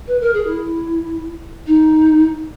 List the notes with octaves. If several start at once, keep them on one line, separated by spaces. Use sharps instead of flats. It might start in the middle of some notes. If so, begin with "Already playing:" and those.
B4
A#4
G#4
E4
D#4